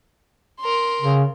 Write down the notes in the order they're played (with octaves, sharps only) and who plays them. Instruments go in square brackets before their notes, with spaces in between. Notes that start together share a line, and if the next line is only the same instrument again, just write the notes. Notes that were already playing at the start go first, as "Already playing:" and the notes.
[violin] A#4 C6
[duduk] C#3